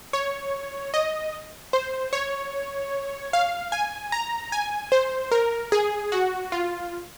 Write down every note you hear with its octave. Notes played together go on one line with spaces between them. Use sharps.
C#5
D#5
C5
C#5
F5
G#5
A#5
G#5
C5
A#4
G#4
F#4
F4